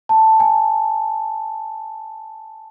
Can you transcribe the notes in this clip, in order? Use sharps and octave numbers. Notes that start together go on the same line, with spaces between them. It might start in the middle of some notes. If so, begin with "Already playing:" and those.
A5
G#5